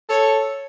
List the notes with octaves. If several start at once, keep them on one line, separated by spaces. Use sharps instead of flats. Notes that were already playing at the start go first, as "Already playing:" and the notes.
A4 C#5